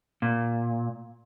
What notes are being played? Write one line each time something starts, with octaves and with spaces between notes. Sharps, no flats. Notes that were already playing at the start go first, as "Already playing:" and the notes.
A#2